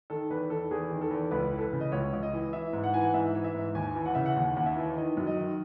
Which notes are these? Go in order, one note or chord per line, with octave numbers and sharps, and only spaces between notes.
D#3 A4
E2 B4
D#3 A4
E2 G#4
D#3
A4
E2
C#2 B4
E3
A4
B4
C#3
D#5
C#2 C#5
C#2
D#5
E3
E3 E5
G#2
F#5
E3 G#5
F#5
G#2 E5
E3
E5
G#2
D#2 G#5
E3
F#5
C#3 E5
F#5
D#2 F#5
D#2 F#5
E5
E3
D#3 D#5
F#2
D#5
D#3